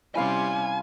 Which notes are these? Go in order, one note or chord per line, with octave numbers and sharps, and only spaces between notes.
C3 G3 C#4 E4 F5 G#5 C6